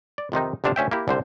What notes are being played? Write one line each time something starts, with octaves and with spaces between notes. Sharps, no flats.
D5
F2 C3 D#3 D#4
G1 C3 D4 F5 A5
D2 C#4 E5 G5
A#3 E4 G4
C2 D3 C5